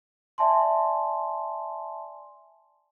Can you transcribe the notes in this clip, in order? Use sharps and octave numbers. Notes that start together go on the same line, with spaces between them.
D5 E5 G#5 A5 C6